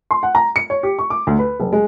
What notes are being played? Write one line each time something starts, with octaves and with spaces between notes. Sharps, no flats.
C6
F#5
A#5
C#7
C#5
G4
C#6
D6
D2
B4
F#1
G#3